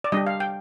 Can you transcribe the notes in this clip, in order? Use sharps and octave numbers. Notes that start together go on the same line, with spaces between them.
D5
G3 D4 G4 D#5
F5
G5